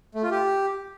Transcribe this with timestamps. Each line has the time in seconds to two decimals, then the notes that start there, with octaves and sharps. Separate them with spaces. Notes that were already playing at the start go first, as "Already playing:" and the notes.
0.15 A3
0.23 F4
0.31 G4